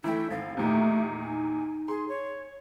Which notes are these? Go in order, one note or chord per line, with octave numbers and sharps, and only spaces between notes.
E3 A3 E4 G5
G#1 F5
E2 A#2 D#3 A3 G4
D#4 G#5
G#4 C6
C#5